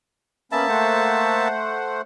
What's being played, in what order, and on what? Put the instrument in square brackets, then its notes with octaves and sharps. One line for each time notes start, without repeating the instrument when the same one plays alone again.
[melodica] A#3 E5 A5 [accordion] B3 C#4 B5
[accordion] A3 C5 F#5